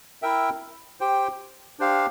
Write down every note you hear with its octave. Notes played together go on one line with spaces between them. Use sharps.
E4 A#4 E5 G5
G4 C5 G5
D4 G4 C5 F5